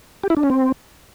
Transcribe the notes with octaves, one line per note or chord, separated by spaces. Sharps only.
G4
E4
D4
C#4
C4